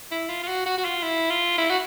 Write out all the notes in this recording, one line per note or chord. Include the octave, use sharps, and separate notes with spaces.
E4
F4
F4
F#4
F#4
F#4
F4
E4
F4
E4
F#4